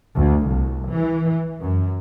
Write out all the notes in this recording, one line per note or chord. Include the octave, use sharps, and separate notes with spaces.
D2
C2
E3
F#2